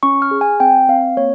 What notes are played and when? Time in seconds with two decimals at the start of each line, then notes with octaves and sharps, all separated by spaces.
0.03 C#4 C#6
0.22 F6
0.31 G#4
0.41 G#5
0.60 C4 G5
0.89 C4 F5
1.17 A#3 C#5